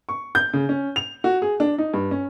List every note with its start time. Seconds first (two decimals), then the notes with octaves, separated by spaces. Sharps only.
0.09 C#6
0.35 G6
0.53 C#3
0.69 C#4
0.96 F7
1.24 F#4
1.42 G#4
1.60 D4
1.78 D#4
1.94 G2
2.11 C#4